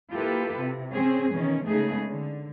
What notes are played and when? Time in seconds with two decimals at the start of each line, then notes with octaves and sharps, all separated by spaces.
0.13 A#3 E4 F4 G4 A4 B4
0.59 C3
0.92 C4 C#4 G#4
1.33 B2 D#3 E3 C#4
1.68 C#3 G#3 A3 B3 D#4 G#4
2.07 D3